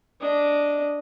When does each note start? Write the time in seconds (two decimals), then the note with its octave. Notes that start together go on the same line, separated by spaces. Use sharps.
0.21 D4 D#5